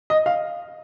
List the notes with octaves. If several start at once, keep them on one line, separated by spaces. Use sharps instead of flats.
D#5
F5